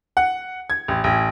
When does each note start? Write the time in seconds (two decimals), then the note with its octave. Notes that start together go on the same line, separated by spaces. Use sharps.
0.17 F#5
0.70 G#6
0.88 A1
1.04 A1